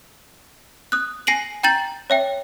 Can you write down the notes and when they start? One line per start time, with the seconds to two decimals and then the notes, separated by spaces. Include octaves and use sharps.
0.92 D#6 F#6
1.27 G#5 A#6 C7 D7 D#7 F#7
1.63 G5 A#5 G6 A6 F#7
2.10 C#5 E5 G5